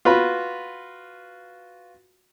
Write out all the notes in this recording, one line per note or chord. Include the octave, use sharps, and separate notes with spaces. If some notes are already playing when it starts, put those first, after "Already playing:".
F4 F#4 B4 B5